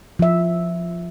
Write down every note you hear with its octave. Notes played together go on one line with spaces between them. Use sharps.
F3 E5